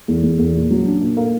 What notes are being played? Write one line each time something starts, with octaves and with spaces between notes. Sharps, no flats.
E2
E2
E2
A#2
F#3
D4
A#2
A#3